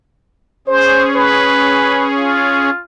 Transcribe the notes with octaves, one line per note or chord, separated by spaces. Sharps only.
C#4 G#4 C5
B4
F4